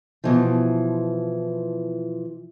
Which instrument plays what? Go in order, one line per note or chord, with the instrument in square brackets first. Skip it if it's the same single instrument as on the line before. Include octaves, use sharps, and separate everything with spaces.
[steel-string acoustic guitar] B2 E3 F3